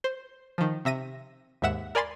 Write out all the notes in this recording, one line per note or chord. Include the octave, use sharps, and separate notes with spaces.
C5
D#3 F3
C3 E5 A#6 D#7
D#2 G#2 E5 F#5 E7
A#4 D5 G#5 B5 C6 A6